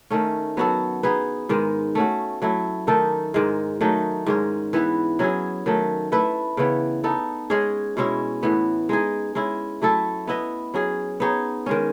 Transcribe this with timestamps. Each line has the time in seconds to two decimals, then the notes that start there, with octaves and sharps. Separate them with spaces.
0.10 D#3 A3 C#4
0.57 F#3 B3 F#4 A4
1.03 B3 D#4 G#4 B4
1.49 G#2 D#3 G#3
1.95 A3 C#4 F#4
2.42 F#3 A3 E4
2.87 D#3 A3 D#4 A4
3.34 G#2 D#3 G#3
3.81 D#3 F#3 A3 D#4
4.26 G#2 D#3 G#3 C#4
4.73 E3 B3 E4 B4
5.19 F#3 C#4 E4 G#4
5.66 D#3 F#3 A3
6.12 A3 E4 B4 E5
6.57 C#3 E3 B3
7.04 B3 D#4 A4
7.50 G#3 C#4 G#4 C#5
7.97 B2 G#3 C#4 E4
8.43 A2 E3 B3
8.89 G#3 D#4 G#4
9.35 G#3 C#4 E4
9.82 F#3 A3 E4 A4
10.27 B3 E4 B4 D#5
10.74 F#3 C#4 G#4
11.20 B3 D#4 G#4 C#5
11.66 D#3 G#3 C#4